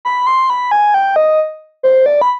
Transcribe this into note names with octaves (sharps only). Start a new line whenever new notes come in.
B5
C6
B5
G#5
G5
D#5
C5
D5
B5